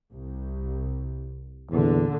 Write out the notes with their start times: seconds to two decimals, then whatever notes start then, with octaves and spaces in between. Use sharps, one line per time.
0.11 C2
1.71 E2 A#2 D3